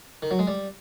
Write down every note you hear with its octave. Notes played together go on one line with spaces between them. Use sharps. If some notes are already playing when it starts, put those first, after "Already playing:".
D#3
F#3
G#3
G3